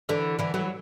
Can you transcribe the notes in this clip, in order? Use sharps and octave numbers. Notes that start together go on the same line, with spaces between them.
D3 E3
D3 E3
E3 F#3